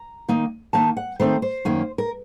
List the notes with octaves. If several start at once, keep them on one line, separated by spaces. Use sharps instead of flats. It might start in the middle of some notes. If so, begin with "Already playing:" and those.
Already playing: A#5
D#3 A#3 D#4
D#3 A#3 D#4 A5
F#5
D#3 A3 C4 D#4 C5
C5
F#2 D#3 A#3 C#4
A#4